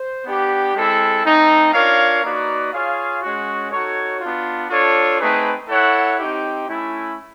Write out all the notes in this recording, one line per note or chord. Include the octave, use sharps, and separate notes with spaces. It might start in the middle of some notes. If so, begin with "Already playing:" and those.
Already playing: C5
B3 D4 G4
G#3 C4 E4 A4
A3 C4 D#4
D4 F4 A#4 C#5 F5
A#3 D#4 F#4 B4 D5
F4 G#4 C#5 F5
G#3 C#4 F#4
D#4 F#4 A4 C#5
B3 D4 F4
D4 F4 A4 C#5
A3 C4 D#4 G#4 B4
E4 A4 C#5 F#5
C4 D#4 G4
A3 C#4 E4